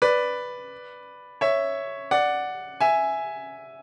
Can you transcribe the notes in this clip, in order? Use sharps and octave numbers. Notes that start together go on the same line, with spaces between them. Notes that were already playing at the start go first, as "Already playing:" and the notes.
B4 D5
C#5 E5
D5 F#5
E5 G#5